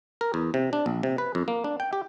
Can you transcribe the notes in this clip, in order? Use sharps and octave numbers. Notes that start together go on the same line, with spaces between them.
A#4
E2
C3
D4
A#1
C3
B4
F2
A#3
D4
G5
G4